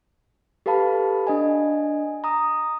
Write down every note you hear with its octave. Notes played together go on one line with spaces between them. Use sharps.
G4 A4 B4 F5 A5 B5
D4 D#5 G#5
A#5 D#6